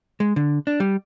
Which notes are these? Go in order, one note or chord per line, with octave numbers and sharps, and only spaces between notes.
G#3
D3
D4
G3